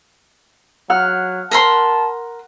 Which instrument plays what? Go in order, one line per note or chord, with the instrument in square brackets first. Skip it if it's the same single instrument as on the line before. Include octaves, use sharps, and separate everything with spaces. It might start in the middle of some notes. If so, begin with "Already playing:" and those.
[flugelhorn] F#3 [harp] F#5 F6
[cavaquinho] A#4 B5 C6 [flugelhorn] A5